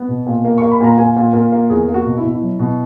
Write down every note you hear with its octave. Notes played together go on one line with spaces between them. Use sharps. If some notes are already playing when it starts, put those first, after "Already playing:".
Already playing: B3
B2
A#2
A#3
A#3 C#6
B5
A#2 A#5
A#2 G#5
A#2
A#2 A#4
A#3
E2 G#4
A#3
F#4
B2
E4
B2
E4
F#3
B2